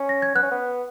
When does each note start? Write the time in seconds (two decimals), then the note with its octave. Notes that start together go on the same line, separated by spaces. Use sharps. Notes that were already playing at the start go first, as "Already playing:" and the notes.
Already playing: C#4
0.09 A#6
0.22 G#6
0.35 B3 F#6
0.43 C#4
0.51 B3